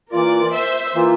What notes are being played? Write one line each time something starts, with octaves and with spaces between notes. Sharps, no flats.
E3 A#3 F4 A#4 D5
C5 E5
E3 A#3 F4